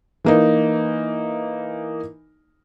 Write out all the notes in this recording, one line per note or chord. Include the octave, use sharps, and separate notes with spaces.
E3 A#3 D#4